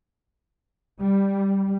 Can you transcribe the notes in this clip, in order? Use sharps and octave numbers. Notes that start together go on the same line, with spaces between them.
G3